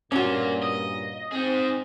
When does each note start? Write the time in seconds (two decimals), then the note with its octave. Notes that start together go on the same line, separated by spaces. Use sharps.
0.12 G2 A#2 A#3 C#4 F4 F#4
0.62 D#5
1.32 C4 D#4 G#4